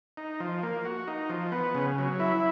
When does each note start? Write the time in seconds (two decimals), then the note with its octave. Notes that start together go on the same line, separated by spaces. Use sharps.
0.17 D#4
0.40 F3
0.63 A#3
0.85 F#4
1.07 D#4
1.30 F3
1.52 B3
1.75 C#3
1.98 F#3
2.20 E4